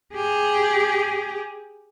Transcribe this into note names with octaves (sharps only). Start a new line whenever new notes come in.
G4 G#4